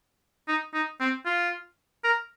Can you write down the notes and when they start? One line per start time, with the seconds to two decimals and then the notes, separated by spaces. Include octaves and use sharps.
0.48 D#4
0.74 D#4
1.00 C4
1.26 F4
2.04 A#4